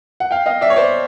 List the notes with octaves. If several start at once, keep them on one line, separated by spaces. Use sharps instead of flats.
F#5
F5 G5
D#5 F5
D5 E5
C#5
C5 D5